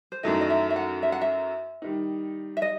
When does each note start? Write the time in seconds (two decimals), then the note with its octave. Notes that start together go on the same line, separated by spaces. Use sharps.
0.12 C5
0.23 F#2 D#3 F#3 A3 E4 D#5
0.41 D#5
0.50 E5
0.71 E5
0.76 F#5
1.03 E5
1.12 F#5
1.21 E5
1.82 D#3 G3 D#4
2.57 E5
2.62 D#5